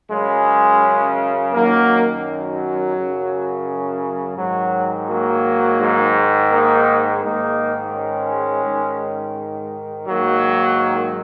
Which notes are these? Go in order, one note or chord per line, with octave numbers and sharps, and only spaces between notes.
F#2 C#3 G#3 C#4
F#2 D#3 F#3 A#3
F#3
F#2 C#3
G#2 D#3 F#3
F#3 A#3
G#2 D#3
A#3 D#4
G#2 D#3 A#3 D#4
G#3 C#4
G#2 D#3
G#2 D#3 F#3 A#3